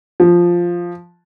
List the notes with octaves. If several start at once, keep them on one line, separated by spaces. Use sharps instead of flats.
F3